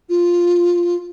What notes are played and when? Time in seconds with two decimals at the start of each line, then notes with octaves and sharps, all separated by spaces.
0.09 F4